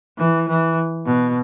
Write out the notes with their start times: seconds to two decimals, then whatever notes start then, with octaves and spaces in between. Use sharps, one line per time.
0.18 E3
0.48 E3
1.06 B2